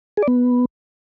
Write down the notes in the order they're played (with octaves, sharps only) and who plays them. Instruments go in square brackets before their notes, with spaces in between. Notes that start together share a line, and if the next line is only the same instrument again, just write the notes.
[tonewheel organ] G#4
D5
B3